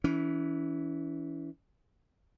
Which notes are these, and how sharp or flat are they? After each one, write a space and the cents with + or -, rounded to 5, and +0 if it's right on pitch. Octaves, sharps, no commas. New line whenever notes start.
E3 -10 C#4 +30